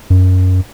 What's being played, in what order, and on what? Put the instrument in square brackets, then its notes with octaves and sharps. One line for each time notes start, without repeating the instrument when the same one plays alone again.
[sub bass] F#2